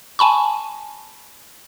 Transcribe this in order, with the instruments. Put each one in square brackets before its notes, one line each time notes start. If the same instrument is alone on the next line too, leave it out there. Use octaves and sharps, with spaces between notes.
[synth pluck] G#5 A5 B5 C#6